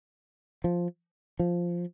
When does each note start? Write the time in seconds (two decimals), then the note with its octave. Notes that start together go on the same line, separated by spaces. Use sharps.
0.64 F3
1.39 F3